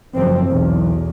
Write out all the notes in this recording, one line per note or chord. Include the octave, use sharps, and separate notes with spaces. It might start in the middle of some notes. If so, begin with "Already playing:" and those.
F#1 F3 C4
B1 E2